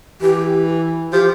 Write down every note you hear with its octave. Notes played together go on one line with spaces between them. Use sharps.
E3 G4
F3 G4